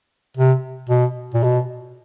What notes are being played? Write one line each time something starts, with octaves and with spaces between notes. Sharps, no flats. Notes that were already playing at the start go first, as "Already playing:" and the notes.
C3
B2
A#2
B2